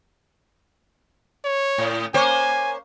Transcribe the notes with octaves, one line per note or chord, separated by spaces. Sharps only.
C#5
A2
A#3 C5 C#5 G#5